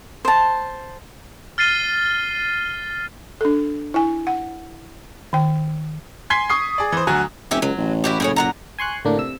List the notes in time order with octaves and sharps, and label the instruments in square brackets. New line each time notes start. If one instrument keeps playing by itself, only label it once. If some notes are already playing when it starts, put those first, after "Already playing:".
[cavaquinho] C5 A5
[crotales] F6 A6 C7 D#7 G7
[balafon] D4 A4
E4 G#5
F#5
D#3 G5
[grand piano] G#5 C6 G#6 B6 C7 G7
C#6 D#6 C7
G#4 D5
E3 C5
D2 F#3 F#4 G#5 A#5
[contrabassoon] F1 [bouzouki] C#4 E4 G4
[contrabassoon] C#2 [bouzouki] F#3
[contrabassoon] A1
[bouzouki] E4 F#4 G4
[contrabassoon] F#1 [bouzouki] A2 G#4 C#5
[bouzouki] A#2 F#5 A#5
[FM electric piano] G#5 C6 C#6 F#6
A2 D3 A#3 D4
C3 E6